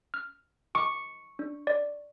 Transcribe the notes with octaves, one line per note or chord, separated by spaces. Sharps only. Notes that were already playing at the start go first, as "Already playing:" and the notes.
F6
C#6 D6
D4
D5